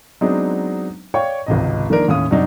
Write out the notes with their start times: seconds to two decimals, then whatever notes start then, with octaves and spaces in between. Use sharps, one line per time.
0.21 F#3 G#3 B3 C4 D4 D#4
1.14 C#5 D5 F5 G5 C#6
1.46 G#1 C#2 C3 D#5
1.90 D#3 F3 A#3 D4 A#4
2.08 D#2 A2 C#4 F5 D#6
2.31 F#2 C3 F#3 D4 D#4 F#4